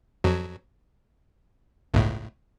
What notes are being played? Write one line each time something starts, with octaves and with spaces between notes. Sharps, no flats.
F2 F#3
G1 C#2 A2